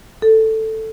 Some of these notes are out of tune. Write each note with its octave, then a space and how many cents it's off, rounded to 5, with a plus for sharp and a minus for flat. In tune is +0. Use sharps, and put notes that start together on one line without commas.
A4 +5